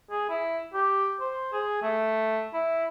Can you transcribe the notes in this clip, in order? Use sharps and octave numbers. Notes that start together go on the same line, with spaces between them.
G#4
E4
G4
C5
G#4
A3
E4